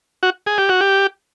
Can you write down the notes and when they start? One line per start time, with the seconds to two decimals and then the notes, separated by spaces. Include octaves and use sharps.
0.23 F#4
0.46 G#4
0.58 G4
0.69 F#4
0.81 G4